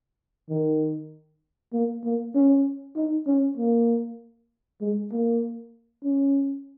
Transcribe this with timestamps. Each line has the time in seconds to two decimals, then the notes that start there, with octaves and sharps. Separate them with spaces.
0.49 D#3
1.73 A#3
2.04 A#3
2.35 C#4
2.96 D#4
3.27 C#4
3.57 A#3
4.81 G#3
5.12 A#3
6.04 C#4